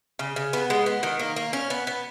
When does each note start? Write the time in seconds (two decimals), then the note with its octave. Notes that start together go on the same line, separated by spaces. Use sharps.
0.19 C#3
0.36 C#3
0.53 B3
0.70 G#3
0.86 B3
1.03 D#3
1.19 A#3
1.36 A#3
1.53 C#4
1.70 B3
1.87 B3